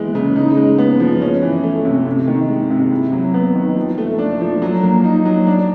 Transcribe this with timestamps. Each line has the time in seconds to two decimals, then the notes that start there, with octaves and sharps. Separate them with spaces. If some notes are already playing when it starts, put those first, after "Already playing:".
Already playing: E3 G#3 B3
0.15 C#3
0.36 D#4
0.57 G#3
0.78 B3
1.00 F3
1.21 C#4
1.42 E3
1.63 A3
1.85 C3
2.06 C3
2.27 D#3
2.49 G#3
2.70 C3
2.91 E4
3.12 F#3
3.34 B3
3.55 D#3
3.76 F3
3.98 A3
4.18 D4
4.41 F3
4.62 F#3
4.83 A#3
5.04 D#4
5.25 F#3
5.47 D4